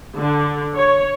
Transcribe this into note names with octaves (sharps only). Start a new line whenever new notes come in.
D3
C#5